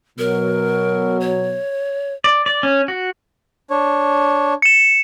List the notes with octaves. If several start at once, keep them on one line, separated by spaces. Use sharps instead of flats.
B2 F#3 A#4
C#5
D5
D5
C#4
F#4
D4 C#5
C#7 E7